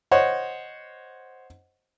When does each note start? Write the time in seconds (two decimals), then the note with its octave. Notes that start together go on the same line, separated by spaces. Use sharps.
0.11 C5 C#5 D#5 F#5